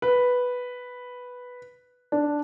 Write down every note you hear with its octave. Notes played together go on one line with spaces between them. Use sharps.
B4
D4